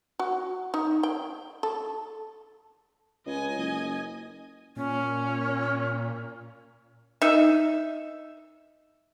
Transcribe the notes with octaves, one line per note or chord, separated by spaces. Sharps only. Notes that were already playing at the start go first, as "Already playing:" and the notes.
F#4
D#4
G5
A4
C#2 D#5 G#5
F#1
A#2 C#4
D#4 E5